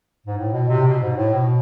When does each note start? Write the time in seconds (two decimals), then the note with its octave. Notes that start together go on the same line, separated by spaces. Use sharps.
0.27 G#2
0.38 A2
0.53 B2
0.69 A2 C3
0.86 B2
1.01 G#2
1.17 A2
1.33 B2